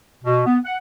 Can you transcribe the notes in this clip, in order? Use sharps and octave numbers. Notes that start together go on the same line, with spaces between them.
B2
B3
F#5